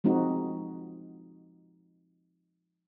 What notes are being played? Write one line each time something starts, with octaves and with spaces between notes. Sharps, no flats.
F3 G#3 C4 D#4 F#4